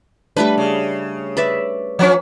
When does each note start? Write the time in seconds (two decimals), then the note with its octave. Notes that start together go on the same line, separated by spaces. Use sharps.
0.37 G3 A3 D4 B4
0.58 C#3
1.37 B4 D5 E5
1.99 F3 C#4